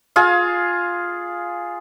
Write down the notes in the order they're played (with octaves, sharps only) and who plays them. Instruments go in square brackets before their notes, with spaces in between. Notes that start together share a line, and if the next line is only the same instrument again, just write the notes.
[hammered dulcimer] F4 G#4 F5